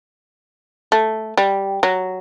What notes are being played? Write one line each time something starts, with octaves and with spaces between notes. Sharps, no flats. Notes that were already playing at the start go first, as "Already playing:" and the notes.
A3
G3
F#3